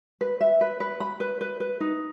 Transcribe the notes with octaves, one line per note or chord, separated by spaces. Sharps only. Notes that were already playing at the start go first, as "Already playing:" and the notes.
B4
E5
B4
B4
B5
B4
B4
B4
D#4